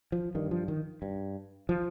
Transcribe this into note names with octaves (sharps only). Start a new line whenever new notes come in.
F3
G2 D#3
F3
D#3
G2
F3